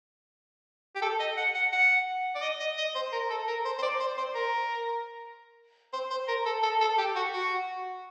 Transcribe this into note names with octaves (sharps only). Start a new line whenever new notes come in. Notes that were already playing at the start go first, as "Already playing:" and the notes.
G4
A4
D#5
F#5
F#5
F#5
D5
D#5
D#5
D#5
C5
A#4
A4
A#4
C5
C5
D5
C5
C5
A#4
C5
C5
A#4
A4
A4
A4
G4
F#4
F#4